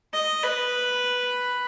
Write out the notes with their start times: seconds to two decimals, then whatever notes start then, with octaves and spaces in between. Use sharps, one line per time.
0.13 D#5
0.43 B4